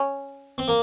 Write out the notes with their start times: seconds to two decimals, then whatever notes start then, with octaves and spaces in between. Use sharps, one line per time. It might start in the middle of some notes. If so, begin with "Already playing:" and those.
Already playing: C#4
0.58 C4
0.68 A#3